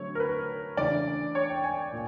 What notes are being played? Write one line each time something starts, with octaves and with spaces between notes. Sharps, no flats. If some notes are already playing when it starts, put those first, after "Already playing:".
Already playing: D3 F#3 A3 C4 C#5
A#4
B4
C#3 E3 A3 D4 D5
C#5
G5
G#5
A#2